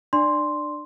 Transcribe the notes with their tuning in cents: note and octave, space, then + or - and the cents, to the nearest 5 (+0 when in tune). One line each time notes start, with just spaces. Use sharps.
D4 +40 D5 +0 C6 +0